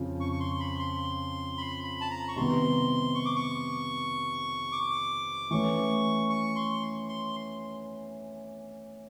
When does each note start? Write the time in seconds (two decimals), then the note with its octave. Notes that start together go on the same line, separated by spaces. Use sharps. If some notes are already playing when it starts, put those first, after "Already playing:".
Already playing: F2 C#3 F3
0.20 C#6
0.32 C#6
0.40 C6
0.60 B5
0.79 C6
1.58 B5
1.84 B5
2.01 A5
2.11 A#5
2.28 C#6
2.36 C3 D#3 G3 B3 C6
3.15 C#6
3.26 D6
3.36 C#6
4.72 D6
5.51 E3 A3 C#4 C#6
6.30 C#6
6.56 C6
7.09 C6